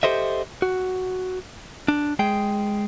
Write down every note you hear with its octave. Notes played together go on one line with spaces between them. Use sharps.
G4 A4 C5 D#5 E5
F#4
D4
G#3 G#4 G5